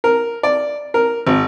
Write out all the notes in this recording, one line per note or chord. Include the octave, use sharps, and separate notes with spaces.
A#4
D5
A#4
G#1